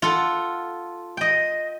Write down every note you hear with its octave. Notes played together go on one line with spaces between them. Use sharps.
F4 A4 F#5
D#5 G5